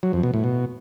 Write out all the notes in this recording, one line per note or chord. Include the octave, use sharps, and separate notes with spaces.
F#3
F2
B2
A2
B2